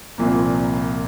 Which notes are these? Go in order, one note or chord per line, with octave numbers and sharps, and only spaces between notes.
C2 A#2 F3 A#3